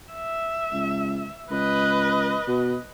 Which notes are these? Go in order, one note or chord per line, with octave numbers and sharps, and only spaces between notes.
E5
C#2
C#2 B4 D#5
B2